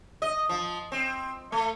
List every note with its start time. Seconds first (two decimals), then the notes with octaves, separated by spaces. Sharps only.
0.22 D#5
0.49 F3
0.92 C4
1.52 A3